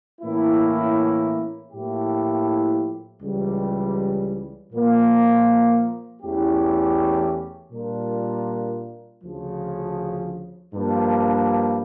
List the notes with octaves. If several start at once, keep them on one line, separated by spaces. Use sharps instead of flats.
A2 E3 A#3 C#4 E4
A2 F3 A#3 E4 G4
C#2 C#3 E3 G3
A#2 F3 A#3
E2 E3 A3 C#4 G4
A#2 G3 D4 F4 A#4
D2 C#3 F3
G2 F3 A#3